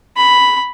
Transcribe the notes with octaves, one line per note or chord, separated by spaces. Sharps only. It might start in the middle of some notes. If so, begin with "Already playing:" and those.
B5